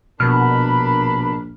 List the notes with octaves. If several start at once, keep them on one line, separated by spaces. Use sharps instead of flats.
A#1 B2 D4 A#4 B5 F6